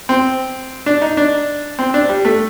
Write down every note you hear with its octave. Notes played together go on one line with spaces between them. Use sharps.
C4
D4
D#4
D4
C4
D4
G3
A3